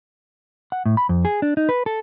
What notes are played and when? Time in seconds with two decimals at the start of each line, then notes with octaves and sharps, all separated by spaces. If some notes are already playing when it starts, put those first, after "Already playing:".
0.72 F#5
0.86 A2
0.97 B5
1.09 F2
1.25 G#4
1.42 D4
1.57 D#4
1.69 B4
1.86 A4